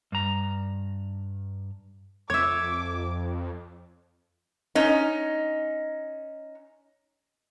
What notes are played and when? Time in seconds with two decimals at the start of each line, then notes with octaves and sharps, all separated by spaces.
0.12 G2 A#5
2.30 F2 C#5 E5 D6 G#6
4.75 C#4 D#4